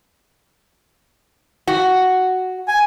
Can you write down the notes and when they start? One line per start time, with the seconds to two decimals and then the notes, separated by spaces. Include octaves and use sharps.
1.67 F#4
2.68 G#5